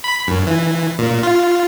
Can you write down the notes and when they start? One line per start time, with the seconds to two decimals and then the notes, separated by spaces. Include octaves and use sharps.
0.04 B5
0.27 F#2
0.47 E3
0.99 A#2
1.23 F4